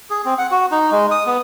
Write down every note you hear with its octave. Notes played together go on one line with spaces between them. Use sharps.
G#4
C4
F#5
F#4
D#4
G#3
D#6
B3